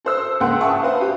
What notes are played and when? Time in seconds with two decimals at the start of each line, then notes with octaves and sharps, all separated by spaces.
0.05 A4 C5 E6
0.40 C#2 A#3 F#5 G5 C6
0.61 E5 F#5 G#5 A5 C#6 D#6
0.82 B4 C5 F5
1.01 G4